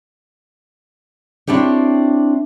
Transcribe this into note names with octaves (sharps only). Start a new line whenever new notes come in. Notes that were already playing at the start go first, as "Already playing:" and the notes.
C4 D4 E4 G4 C#5